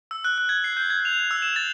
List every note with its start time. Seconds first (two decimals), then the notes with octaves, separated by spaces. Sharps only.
0.11 E6
0.25 F#6
0.38 F#6
0.49 G#6
0.64 C7
0.77 G6
0.90 G#6
1.05 F7
1.31 E6
1.42 E7
1.56 A6